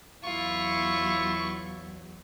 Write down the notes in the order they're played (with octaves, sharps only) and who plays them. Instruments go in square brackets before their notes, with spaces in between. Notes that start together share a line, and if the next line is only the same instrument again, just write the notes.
[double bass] E2 F#3 [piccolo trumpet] E4 [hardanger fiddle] F4 [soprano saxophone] C#6